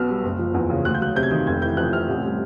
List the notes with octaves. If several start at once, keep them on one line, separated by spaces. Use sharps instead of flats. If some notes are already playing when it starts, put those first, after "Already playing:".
Already playing: B1 B2 B3 E6 F6
G3
F#1
F3
E2
C#3
D2 F#6
G6
F#3 F#6
C3 G6
G#6
D#3 G6
F1 G#6
E3 G6
F2 F#6
C3 F6
A1
G3